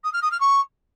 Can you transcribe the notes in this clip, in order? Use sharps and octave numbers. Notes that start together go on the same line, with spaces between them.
D#6
F6
D#6
F6
C#6